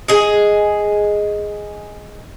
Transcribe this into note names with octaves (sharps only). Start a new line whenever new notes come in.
G#4 D#5